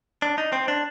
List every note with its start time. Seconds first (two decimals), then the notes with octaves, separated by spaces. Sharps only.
0.22 D4
0.38 D#4
0.53 C4
0.68 D4